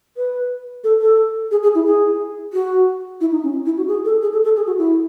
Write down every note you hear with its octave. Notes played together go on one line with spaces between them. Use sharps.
B4
A4
A4
G#4
G#4
E4
G#4
F#4
E4
D#4
C#4
E4
F#4
G#4
A4
G#4
A4
A4
G#4
F#4
E4